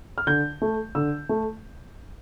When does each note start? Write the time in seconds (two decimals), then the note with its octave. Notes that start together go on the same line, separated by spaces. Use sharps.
0.18 F6
0.27 D3 G6
0.62 A3
0.95 D3 E6
1.29 A3